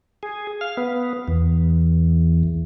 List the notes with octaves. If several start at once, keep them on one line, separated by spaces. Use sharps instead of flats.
G#4
F5
B3
E2